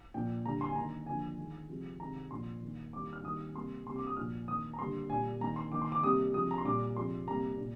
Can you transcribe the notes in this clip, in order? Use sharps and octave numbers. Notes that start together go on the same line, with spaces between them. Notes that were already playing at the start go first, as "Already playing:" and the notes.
A#2 F3 A#3 G5
D3 G3 A#3 A#5
C6
G#5
D#3 A#3 A#5
D3 F3 A#3 G#5
D#3 G#3
C3 F3 G#3
C3 D#3 G#3 A#5
A#2 F3 A#3 C6
D#3 A#3
D#3 G3 A#3 D6
F6
D#3 G3 A#3 D#6
C3 G3 A#3 C6
C3 G3 A#3 C6
D6
D#6
A#2 F3 A#3 F6
D#3 A#3 D#6
A#5
D3 G3 A#3 C6
A#2 G3 A#3 G#5
D#3 A#3 A#5
C6
D#3 A#3 D6
C6
D6
C3 G3 A#3 D#6
C3 F3 G#3 D#6
A#5
C6
A#2 G3 A#3 D6
C3 F3 G#3 C6
C3 G3 A#3 A#5
A#2